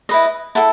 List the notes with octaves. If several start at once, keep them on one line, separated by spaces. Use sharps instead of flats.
E4 B4 D#5
E4 A4 F#5 A5